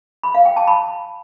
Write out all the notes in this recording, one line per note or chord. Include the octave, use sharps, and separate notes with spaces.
B5
F5
G5
A5
B5